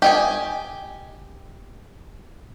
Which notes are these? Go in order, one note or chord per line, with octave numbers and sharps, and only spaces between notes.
G4 D#5 G#5